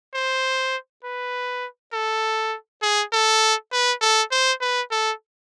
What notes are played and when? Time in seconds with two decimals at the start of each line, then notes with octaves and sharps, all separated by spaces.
0.14 C5
1.04 B4
1.93 A4
2.82 G#4
3.13 A4
3.72 B4
4.01 A4
4.32 C5
4.61 B4
4.91 A4